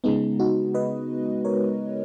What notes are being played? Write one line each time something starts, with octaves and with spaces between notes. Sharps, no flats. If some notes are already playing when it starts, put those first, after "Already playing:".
C#3 G#3 B3 D#4
D#4 F#4
B4 D#5
A#4 C#5